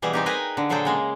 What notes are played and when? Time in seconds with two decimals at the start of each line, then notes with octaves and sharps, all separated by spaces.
0.02 B2 E3 G3 G#4
0.13 C4 D#4 G4
0.26 G#4 A#4 B4 D#5 G5 G#5
0.57 D3
0.69 A#2 F#3 G#4 A4 C5 G5
0.85 C#3 G#3 A#3